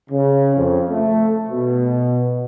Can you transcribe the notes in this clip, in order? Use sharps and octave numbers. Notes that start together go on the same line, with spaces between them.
C#3
F2
A3
B2